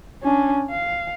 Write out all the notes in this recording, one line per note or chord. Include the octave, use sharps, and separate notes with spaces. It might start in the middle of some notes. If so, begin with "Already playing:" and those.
C#4 D4
F5